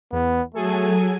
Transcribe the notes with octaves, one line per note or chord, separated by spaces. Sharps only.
E2 B3
F#3 A3 G#4 A4 G#5